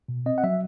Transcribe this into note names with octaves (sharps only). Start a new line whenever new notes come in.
B2
C4 D#5
F#5
F#3 E5